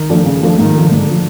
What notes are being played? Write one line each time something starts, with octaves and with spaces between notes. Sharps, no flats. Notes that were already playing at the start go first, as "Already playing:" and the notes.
Already playing: D#3
F3 A3 D4
C#3
F3 A3 D4
G#2 D#3
F3 A3
G#2 D3
F3 A3